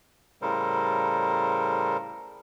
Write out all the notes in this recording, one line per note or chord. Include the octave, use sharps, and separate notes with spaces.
A2 C#3 G3 A4 A#4 C5